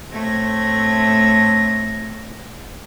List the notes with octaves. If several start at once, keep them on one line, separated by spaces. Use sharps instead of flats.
A2 A3 C4 G#6 A#6